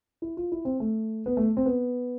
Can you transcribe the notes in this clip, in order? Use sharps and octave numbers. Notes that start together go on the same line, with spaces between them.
E4
F4
E4
C4
A3
B3
A3
C4
B3